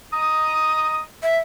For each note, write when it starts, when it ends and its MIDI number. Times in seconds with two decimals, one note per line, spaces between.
0.13 1.03 75
0.13 1.03 82
0.13 1.03 87
1.23 1.37 76